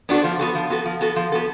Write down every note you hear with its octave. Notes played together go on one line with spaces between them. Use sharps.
B3 D4 F#4 A4
F3
B3 F#4 A4
F3
B3 F#4 A4
F3
B3 F#4 A4
F3
B3 F#4 A4